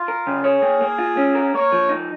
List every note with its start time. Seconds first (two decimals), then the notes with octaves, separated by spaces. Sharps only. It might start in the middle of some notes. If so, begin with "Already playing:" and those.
Already playing: F4
0.08 A#4
0.27 C#3
0.44 G#4 C#5
0.62 A#3
0.81 A#3
0.98 F4
1.17 C#4
1.35 A#4
1.54 A#3 C#5
1.72 F3
1.89 D#4